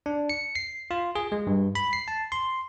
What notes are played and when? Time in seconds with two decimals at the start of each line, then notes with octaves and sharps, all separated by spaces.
0.06 D4
0.29 C#7
0.55 C7
0.91 F4
1.15 G#4
1.32 G#3
1.47 G2
1.75 B5
1.93 C7
2.08 A5
2.32 C6